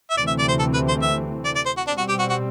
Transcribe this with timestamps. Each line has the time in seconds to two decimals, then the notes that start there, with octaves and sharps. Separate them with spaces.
0.10 E5
0.17 D2 C3 E3 A3 C4 D5
0.27 E5
0.38 D5
0.48 C5
0.59 A4
0.73 B4
0.88 C5
1.02 E5
1.45 D5
1.55 D5
1.66 C5
1.77 F#4
1.87 B2 G3 C4 D4
1.98 F#4
2.09 G4
2.19 F#4
2.29 F#4